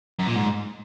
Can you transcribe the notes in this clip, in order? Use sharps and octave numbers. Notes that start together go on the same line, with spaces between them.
F#2
A#2
G#2